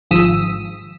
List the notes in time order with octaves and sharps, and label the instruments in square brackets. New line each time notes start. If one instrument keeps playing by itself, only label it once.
[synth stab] G#1 G#2 F3 D#6 E6 B6